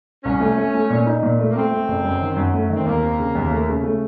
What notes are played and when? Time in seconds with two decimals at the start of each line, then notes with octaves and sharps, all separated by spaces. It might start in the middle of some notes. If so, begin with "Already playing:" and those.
0.24 C2 C#4
0.40 A3
0.57 A3
0.74 A3
0.90 A#2
1.06 D#4
1.23 A#2
1.39 A3
1.50 A#3
1.56 A3 C4
1.71 A3
1.88 F#1
2.04 F#2
2.21 D#3
2.37 F#2
2.54 A3
2.70 D#3 C4
2.86 D#2 A#3
3.03 C4
3.19 C#3
3.35 D#2
3.51 A3
3.69 C#3
3.84 A3